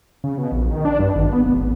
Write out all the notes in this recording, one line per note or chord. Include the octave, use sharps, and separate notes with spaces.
C#3
B2
A#1
D#3
D4
G2
G#1
B3
F1
G#1